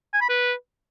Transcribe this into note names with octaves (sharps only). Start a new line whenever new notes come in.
G#5
B5
B4